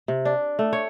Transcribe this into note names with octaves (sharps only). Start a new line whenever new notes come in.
C3
D4
A3
C#5